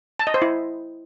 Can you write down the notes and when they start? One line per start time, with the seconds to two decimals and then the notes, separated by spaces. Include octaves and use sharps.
0.19 A5
0.27 D#5
0.34 C5
0.42 E4